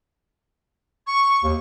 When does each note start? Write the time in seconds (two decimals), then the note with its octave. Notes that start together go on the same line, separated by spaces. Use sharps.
1.07 C#6
1.44 D#2